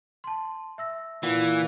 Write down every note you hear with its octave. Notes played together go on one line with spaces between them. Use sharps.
A5 C6
E5 E6 A#6
A#2 E3 E4 F#5